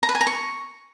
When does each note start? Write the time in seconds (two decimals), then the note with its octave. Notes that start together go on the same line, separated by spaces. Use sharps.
0.03 A#5
0.09 B4
0.15 G#5
0.21 A#5
0.27 C#6